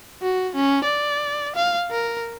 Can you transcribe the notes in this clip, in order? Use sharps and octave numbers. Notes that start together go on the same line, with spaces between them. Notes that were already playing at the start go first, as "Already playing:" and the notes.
F#4
C#4
D5
F5
A#4